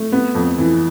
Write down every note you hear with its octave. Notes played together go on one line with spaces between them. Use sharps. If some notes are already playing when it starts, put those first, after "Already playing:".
Already playing: A3
B3
F2
E3